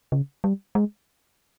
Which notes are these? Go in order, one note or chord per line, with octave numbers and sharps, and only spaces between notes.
C#3
G3
G#3